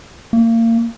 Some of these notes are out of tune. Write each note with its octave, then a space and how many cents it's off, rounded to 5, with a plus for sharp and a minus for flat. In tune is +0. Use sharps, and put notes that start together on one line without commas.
A#3 -30